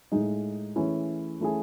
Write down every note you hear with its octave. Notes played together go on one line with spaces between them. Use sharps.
A2 G#3 D#4
E3 A3 C#4 E4 G#4
E3 A3 C#4 E4 G#4